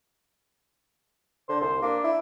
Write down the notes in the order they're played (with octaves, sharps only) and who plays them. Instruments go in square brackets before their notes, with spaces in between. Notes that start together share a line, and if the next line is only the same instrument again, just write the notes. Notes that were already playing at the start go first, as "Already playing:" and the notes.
[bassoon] D3 [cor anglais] C5
[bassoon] C2 [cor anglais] C5
[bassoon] A#3 [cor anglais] D4
[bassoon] E4